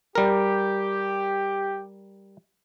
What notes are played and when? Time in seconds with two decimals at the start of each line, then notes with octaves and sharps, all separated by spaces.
0.15 G3 G4 A#4